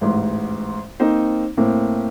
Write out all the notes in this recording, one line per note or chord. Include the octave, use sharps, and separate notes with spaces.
A1 G#2
A#3 C4 D#4 C5
A2 A#3 C4